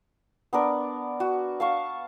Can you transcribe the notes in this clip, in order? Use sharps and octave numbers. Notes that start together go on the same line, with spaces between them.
B3 D4 A#4
F#4
F5 A5 C#6